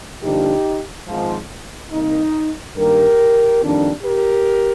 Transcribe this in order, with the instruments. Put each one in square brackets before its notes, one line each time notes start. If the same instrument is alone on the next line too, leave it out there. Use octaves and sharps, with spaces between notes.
[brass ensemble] G2 D3 F3 A#3 D4 D#4 G4
G#1 G#2 F3
C2 C3 D#3 A#3 D#4
G2 D#3 G3 A#3 G4 A#4
F2 D#3 G3 A#3 D4
G4 A#4